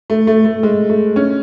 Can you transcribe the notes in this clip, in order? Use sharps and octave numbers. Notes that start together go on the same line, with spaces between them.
A3
A3
A3
G#3
A3
C#4